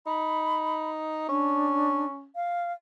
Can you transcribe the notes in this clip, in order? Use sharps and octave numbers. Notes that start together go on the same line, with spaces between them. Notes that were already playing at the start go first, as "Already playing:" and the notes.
D#4 B5
C#4 D4
F5